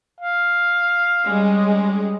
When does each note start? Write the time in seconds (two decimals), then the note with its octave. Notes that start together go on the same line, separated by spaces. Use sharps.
0.20 F5
1.25 G3 G#3 C#4